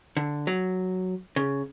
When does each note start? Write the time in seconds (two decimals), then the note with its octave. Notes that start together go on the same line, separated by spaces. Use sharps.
0.17 D3
0.47 F#3
1.36 C#3